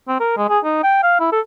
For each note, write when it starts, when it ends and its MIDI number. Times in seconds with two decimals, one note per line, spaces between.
0.08 0.17 60
0.20 0.33 70
0.37 0.46 56
0.49 0.59 68
0.64 0.81 63
0.83 1.00 79
1.03 1.15 77
1.20 1.28 64
1.32 1.40 69